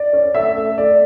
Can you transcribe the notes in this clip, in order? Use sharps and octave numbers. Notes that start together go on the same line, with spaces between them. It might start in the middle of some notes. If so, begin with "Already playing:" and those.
Already playing: D5
C#4
A3 E5
A3
A3 D5